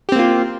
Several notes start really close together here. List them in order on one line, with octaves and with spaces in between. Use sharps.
G4 C4 A#3 F4